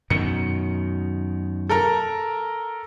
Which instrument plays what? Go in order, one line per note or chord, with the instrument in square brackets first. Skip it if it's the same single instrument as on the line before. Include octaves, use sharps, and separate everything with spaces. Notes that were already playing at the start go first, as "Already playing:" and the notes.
[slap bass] F#2 B2 D#3 [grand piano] C#7
[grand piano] A4 A#4 A#5